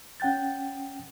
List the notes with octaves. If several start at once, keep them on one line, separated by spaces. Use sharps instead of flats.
C#4 F#5 G5 G6 A6